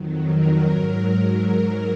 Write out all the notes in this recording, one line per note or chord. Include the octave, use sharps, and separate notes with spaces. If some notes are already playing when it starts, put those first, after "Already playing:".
Already playing: F2 D#3 F#3
A#4
G#2 F#3